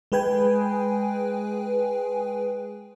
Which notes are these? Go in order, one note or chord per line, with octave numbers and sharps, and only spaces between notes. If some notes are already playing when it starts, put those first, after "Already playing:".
G#3 G#4 B4 G5 G#5